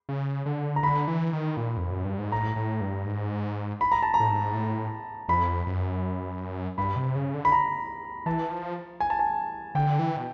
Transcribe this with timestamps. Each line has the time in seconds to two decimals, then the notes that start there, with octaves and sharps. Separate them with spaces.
0.09 C#3
0.46 D3
0.76 A#5
0.83 D3 B5
1.07 E3
1.33 D#3
1.57 A#2
1.77 F2
1.90 F#2
2.04 G2
2.19 G#2
2.32 A2 A#5
2.56 A2
2.81 G2
3.06 G#2
3.81 B5
3.92 A#5
4.03 A5
4.14 A#5
4.20 A2
4.29 G#2
4.54 A2
5.29 F2 B5
5.67 F#2
6.78 G2 B5
6.96 C3
7.15 C#3
7.34 D3
7.45 B5
7.52 A#5
8.26 E3 A5
8.51 F3
9.00 G#5
9.10 A5
9.19 G#5
9.75 D3 G5
9.99 E3
10.17 B2